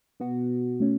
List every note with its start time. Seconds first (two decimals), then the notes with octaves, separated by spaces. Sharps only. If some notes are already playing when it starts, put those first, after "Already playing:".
0.20 B2 B3 F#4
0.80 A3 C#4